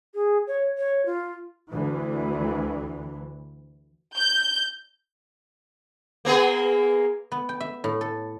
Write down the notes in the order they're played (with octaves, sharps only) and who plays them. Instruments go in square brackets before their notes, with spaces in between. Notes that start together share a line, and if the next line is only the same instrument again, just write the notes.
[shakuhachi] G#4
C#5
C#5
F4
[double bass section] D2 E3
[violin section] G6
[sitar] A#3 B3 G#4
[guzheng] B3
G5
E5
A2
A4